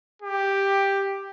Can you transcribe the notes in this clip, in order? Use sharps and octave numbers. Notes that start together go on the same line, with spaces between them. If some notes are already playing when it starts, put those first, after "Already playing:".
G4